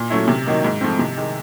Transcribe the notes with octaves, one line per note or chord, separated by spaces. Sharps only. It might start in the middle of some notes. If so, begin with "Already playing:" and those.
Already playing: A#2
F#3 A3 C#4 E4
C3
D#3 F#3 A#3 D#4
G#2
F3 A3 C4
C3
D#3 G#3